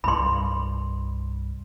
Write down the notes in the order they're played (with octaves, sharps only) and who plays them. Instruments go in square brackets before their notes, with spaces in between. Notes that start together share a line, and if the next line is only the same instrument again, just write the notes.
[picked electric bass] C2 G2 [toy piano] B5 C6